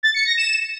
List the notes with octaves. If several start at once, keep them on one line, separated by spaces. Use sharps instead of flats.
A6
C#7
A#6
E7